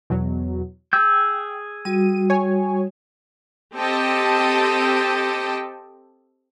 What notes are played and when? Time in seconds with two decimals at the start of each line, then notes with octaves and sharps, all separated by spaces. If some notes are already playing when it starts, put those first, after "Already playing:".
0.10 E2 B2 F#3
0.93 G#4 G5 E6 G6
1.85 G3 F#4 D#7
2.30 C#5 G#5
3.76 C4 G4 A4 D#5 G5 A5